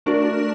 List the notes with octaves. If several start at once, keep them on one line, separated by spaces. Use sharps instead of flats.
A3 D4 F#4 A#4 D5